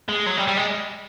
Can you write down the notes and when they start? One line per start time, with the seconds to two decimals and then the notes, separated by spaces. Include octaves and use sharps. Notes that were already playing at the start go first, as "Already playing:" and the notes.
0.08 G#3
0.26 F#3
0.37 G3
0.47 G3
0.57 G#3